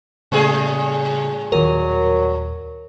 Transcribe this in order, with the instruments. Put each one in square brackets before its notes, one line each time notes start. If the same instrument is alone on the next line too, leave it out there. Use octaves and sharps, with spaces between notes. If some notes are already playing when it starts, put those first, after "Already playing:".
[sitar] A2 G3 G#4 [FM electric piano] C#3 A3
[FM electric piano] D#2 A#2 [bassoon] F#3 [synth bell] A#4